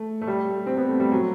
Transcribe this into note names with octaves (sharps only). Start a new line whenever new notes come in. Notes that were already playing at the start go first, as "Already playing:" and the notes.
Already playing: A3
A3
G3
C4
B3
A3
G3
F#3